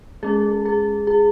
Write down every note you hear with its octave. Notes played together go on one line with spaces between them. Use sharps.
G#3 C#4 G#4
G#4
G#4